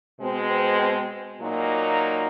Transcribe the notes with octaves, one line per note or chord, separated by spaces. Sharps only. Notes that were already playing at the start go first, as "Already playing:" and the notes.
B2 G#3 C4
A#2 F#3 A#3 D#4